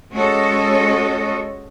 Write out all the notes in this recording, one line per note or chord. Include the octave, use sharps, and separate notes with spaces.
G#3 C#4 F#4 A4 C#5 D#5